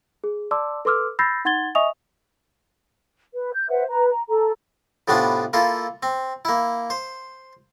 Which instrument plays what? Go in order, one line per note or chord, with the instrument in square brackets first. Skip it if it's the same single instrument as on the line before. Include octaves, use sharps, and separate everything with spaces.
[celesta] G#4
D5 A5 C6 D6 E6
A4 B4 C6 D6 E6 F6
B5 E6 G6 A6 A#6 C7
D#4 F#5 C6 G#6 A6 G7
D#5 E5 G#5 C#6 D#6 F7
[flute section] B4
G6
B4 C5 E5 F#5
B4 A#5
A#5
A4 A#5
[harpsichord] A2 C3 B3 C#4 D4 F4
A#3 E4 F4 A4
C4
A#3 E4
C5